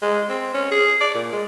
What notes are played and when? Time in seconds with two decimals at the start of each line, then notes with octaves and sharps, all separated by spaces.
0.02 G#3
0.29 C4
0.54 C#4
0.71 G#4
1.00 D5
1.14 A#2
1.33 G#3